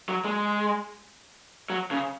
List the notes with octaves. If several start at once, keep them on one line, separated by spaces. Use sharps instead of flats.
F#3
G#3
F#3
C#3